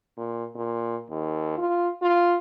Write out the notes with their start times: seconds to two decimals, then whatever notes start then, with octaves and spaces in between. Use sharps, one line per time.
0.17 A#2
0.55 A#2
1.10 D#2
1.58 F4
2.02 F4